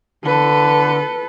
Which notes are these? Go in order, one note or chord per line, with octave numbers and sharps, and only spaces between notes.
D3 A4 B4